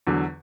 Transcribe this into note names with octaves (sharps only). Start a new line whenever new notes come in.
E2 D3 F#3